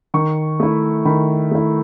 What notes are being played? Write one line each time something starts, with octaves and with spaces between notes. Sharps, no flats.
D#3 C#6
A3 E4
D#3 B5
A3 E4